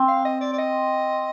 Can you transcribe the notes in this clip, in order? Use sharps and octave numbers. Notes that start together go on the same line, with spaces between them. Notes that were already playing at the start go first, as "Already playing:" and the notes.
Already playing: C4
F5
D#5
D5
D5
D#5